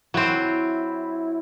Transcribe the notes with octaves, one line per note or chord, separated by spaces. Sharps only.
F#3 C4 E4